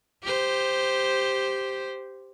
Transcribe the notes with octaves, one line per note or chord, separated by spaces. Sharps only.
G4 C5